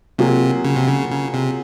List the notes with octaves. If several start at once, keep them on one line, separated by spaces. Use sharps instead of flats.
C3 F#3 A#3 F4 G#4
C#3
C3
C#3
C#3
C3